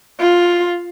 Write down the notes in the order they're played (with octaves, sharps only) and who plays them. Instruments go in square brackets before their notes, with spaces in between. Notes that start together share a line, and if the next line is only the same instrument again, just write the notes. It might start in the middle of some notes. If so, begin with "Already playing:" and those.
[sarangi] F4